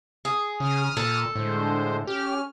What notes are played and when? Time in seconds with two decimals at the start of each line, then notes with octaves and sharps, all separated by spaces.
0.25 G#4
0.60 C#3 D#6 F6
0.97 A#2 A4
1.36 A2 D3 G#3 C5
2.07 C#4 G4 F6